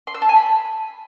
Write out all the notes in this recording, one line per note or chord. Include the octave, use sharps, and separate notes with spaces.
C6
E6
A5
G#5
B5